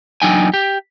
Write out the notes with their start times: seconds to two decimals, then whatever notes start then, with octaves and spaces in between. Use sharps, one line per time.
0.22 E2 F#3 D4 D#4 G5 G#5
0.54 G4